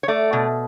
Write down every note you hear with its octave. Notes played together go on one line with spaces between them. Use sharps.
C#5
A3 D5
B2